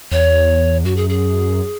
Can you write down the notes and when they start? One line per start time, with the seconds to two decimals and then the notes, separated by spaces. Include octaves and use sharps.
0.11 E2 C#5
0.84 F#2 F#4
0.97 G#4
1.09 G#4